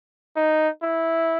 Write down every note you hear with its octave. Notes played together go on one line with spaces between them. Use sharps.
D#4
E4